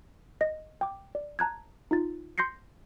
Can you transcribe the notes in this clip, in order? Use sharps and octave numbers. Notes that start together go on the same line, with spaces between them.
D#5 A#6
G5 D6
D5
A5 A#5 F#6 G#6
D#4 F4 A6
C6 G6 A#6 C7 C#7